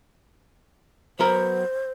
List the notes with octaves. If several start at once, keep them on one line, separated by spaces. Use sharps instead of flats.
F#3 B3 A#4 C5